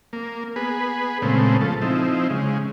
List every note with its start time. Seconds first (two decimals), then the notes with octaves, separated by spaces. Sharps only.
0.13 A#3
0.56 B3 G#4 B4
1.22 A#2 C#3 G#3 A3 B3 C4
1.61 F3 A4
1.82 F3 C4 D#4 E4
2.30 C#3 G#3